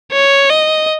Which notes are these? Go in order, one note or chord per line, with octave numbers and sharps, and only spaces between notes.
C#5
D#5